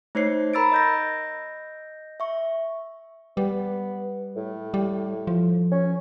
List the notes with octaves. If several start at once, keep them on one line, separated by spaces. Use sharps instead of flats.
A3 D#4 C5 C#5 C7
A#4 A#5 B5 E6 A6 D7
D#5 G6 A#6
E5 C#6
G3 B3
A2
G3
F3
C#4